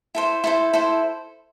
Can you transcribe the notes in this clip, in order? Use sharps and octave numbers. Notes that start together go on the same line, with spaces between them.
E4 A4 C5
E4 A4 C5
E4 A4 C5